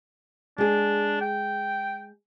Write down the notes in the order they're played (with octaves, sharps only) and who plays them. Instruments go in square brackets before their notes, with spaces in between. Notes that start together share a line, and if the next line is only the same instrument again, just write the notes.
[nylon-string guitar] G#3 G#4 [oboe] D4
[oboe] G5